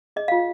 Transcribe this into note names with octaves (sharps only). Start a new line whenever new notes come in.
G#4 D#5
F4 F5